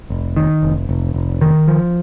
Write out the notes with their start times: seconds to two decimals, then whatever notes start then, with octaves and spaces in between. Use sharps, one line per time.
0.10 F1
0.36 D#3
0.63 F1
0.89 F1
1.14 F1
1.41 D#3
1.67 F3